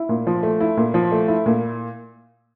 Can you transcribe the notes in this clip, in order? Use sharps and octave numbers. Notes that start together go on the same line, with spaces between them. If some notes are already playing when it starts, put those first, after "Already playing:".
Already playing: E4
A#2
F3
A3
E4
A#2
F3
A3
E4
A#2